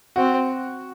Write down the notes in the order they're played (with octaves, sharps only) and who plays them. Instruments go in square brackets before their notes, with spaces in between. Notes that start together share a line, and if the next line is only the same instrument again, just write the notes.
[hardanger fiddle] C4 [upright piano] F#4